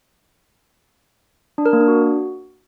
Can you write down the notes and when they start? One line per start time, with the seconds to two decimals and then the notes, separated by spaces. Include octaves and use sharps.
1.58 D4
1.66 A#4
1.73 A#3
1.80 D4
1.88 F#4